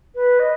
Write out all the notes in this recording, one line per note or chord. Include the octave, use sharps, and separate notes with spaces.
B4
D#5